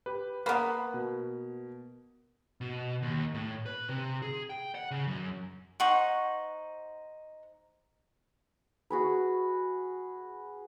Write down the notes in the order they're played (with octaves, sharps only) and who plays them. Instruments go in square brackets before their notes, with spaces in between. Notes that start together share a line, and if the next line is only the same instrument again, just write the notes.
[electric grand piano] G4 B4
[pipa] A#3 B3 [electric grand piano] B4 B5 C#6
[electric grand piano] B2
[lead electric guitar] B2
D#2
A2
B4
C3
G#4
G5
F#5
C#3
F#2
[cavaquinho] D#4 C5 F#5 C#6
[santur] F#4 G#4 B4